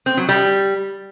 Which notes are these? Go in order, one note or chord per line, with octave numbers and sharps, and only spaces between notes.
C4
F#3
G3